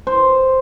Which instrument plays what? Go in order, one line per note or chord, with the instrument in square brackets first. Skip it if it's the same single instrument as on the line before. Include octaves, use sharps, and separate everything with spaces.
[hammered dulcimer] C5